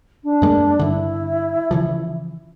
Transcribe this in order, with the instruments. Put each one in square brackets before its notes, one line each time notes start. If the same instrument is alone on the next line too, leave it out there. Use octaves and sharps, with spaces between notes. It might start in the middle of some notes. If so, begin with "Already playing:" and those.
[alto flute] D4
[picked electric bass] F#2 G#3 A#3
[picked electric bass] G2 D3 [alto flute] E4
[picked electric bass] C#3 E3 F3